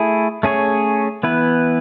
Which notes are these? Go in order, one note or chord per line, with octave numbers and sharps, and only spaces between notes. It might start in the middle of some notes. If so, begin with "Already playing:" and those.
Already playing: A3 E4 G#4
A3 C#4 G#4 C#5
E3 B3 E4 B4